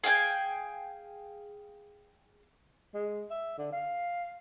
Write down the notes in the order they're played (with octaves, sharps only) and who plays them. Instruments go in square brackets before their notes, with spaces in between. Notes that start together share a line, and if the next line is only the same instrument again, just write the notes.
[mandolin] G#4 F5 G5 G#5
[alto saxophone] G#3
E5
D3
F5